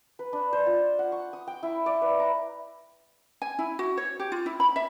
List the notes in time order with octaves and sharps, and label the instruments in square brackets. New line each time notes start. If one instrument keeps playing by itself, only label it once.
[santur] B4
D4
C5
F4
F#5
C#6
D#6
G5
E4
D5
B4
A#5
[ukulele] G#5
E4
F#4
C#5
G4
F4
E4
B5
E5